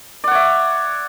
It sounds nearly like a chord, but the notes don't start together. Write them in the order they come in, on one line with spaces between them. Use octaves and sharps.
D5 F#5 C#5 E5